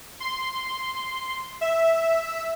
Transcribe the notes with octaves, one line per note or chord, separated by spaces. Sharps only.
C6
E5